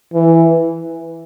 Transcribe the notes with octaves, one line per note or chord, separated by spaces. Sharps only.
E3